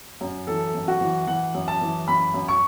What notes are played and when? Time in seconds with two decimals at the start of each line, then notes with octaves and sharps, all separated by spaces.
0.21 F#2
0.47 E3 A4
0.74 F#2
0.88 F#4
1.01 E3
1.27 E3 F#5
1.54 F#2
1.68 A5
1.81 E3
2.08 F#2 B5
2.34 F#2
2.48 C#6